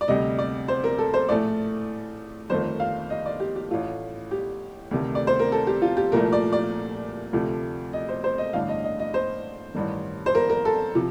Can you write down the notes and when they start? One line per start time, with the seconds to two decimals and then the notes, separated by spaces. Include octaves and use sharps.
0.01 D5
0.08 D2 C3 G3 D#5
0.39 D5
0.68 C5
0.84 A#4
0.99 A4
1.14 C5
1.29 A#1 A2 A3 D5
2.50 G1 F2 D#3 A3 C5
2.80 F5
3.10 D#5
3.26 D5
3.40 G4
3.56 G4
3.71 A1 A2 A3 F4
4.31 G4
4.91 D2 C3 D#3 A3
5.15 D5
5.27 C5
5.39 A#4
5.52 A4
5.67 G4
5.82 F4
5.97 G4
6.12 C2 A#2 F3 A3 A#4
6.33 D5
6.53 D5
7.33 D2 C3 F3 A3
7.93 D#5
8.09 C5
8.24 C5
8.38 D#5
8.53 A1 G2 D3 A3 F5
8.69 D#5
8.84 D#5
8.99 D#5
9.14 C5
9.74 A1 G2 D#3
10.26 C5
10.35 A#4
10.50 A#4
10.65 A4
10.95 C3 F3